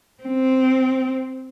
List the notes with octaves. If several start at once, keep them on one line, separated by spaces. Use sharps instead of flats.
C4